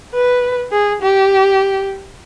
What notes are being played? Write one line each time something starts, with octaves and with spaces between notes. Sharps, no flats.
B4
G#4
G4